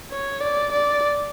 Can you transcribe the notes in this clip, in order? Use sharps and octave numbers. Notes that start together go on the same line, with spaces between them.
C#5
D5
D5